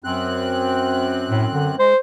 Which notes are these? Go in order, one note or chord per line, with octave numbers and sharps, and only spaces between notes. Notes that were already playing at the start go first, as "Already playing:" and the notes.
F#2 C4 F#6
A2
D3
G#3 C5